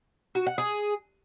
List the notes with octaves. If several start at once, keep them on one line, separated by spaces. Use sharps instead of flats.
F#4
F#5
G#4